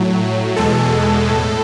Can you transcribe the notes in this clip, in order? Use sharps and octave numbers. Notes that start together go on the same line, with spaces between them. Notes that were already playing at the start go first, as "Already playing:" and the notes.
Already playing: A2 F#3
E2 B2 G#3 A4
A2